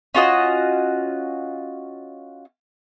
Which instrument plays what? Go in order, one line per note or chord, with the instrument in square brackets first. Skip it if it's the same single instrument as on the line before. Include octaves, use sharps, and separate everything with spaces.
[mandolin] C#4 F4 F#4 D#5